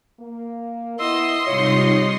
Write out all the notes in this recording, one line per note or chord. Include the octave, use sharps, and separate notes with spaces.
A#3
B3 E4 D#5 C6 E6
G#2 C3 G3 D#4 F4 C#5